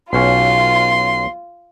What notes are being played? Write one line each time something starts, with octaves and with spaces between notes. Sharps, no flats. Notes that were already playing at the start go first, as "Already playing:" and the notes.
B1 C#4 F4 C6